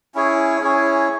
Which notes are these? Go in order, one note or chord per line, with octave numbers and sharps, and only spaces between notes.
C#4 E4 G#4 C#5
C#4 E4 G#4 C#5